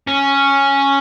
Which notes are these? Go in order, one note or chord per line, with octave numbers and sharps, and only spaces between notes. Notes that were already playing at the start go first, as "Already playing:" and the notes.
C#4